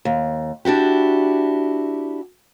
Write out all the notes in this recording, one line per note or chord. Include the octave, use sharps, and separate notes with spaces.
D#2
D4 E4 F#4 G4